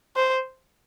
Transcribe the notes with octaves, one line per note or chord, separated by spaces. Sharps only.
C5